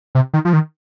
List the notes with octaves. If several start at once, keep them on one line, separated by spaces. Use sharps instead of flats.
C3
D#3
F3
D#3